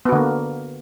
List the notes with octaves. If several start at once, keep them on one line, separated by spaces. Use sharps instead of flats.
D3 A#3 B3 F#4